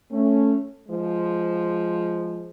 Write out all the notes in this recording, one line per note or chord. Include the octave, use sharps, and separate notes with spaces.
A3 C#4
F3 G#3